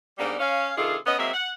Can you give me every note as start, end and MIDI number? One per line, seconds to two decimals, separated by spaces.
0.18 0.36 44
0.18 0.36 55
0.18 0.36 58
0.18 0.36 59
0.18 0.36 62
0.18 0.36 63
0.39 0.72 61
0.39 0.72 77
0.77 0.95 48
0.77 0.95 51
0.77 0.95 62
0.77 0.95 65
0.77 0.95 68
0.77 0.95 69
1.06 1.14 59
1.06 1.14 61
1.06 1.14 75
1.18 1.29 54
1.18 1.29 56
1.18 1.29 58
1.18 1.29 60
1.18 1.29 76
1.34 1.51 78